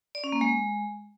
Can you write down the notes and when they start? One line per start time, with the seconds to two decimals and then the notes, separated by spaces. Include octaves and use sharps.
0.15 D5
0.24 C#4
0.32 A#3
0.41 G#3